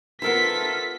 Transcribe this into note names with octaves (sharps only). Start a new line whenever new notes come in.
B3 F4 A4 A#4 C5 E5 B6